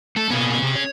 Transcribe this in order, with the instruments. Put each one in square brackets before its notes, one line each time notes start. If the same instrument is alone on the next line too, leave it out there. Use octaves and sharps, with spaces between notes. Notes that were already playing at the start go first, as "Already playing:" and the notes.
[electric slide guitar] A3 [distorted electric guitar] A4
[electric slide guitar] B2 A#3 B3 [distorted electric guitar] C#4 G#4
[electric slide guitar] C3
C#5